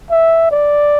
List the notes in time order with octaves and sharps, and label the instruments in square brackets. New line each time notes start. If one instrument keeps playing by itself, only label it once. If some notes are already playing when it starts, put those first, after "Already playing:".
[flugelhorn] E5
D5